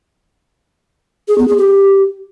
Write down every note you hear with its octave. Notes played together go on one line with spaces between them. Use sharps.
G#4
B3
G#4
G4